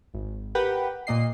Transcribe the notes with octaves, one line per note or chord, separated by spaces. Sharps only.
G#1
G4 A#4 B4 F#5 G5
A#2 A#3 D#5 C7